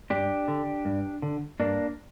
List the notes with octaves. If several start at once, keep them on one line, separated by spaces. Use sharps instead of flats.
G2 D4 G4
D3
G2
D3
G2 A#3 D4